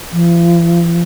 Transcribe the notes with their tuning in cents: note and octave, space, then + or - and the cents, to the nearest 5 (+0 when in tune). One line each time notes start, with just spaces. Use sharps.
F3 -40